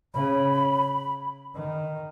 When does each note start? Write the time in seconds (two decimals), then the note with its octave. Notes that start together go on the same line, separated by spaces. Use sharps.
0.14 C#3 B5
1.56 D#3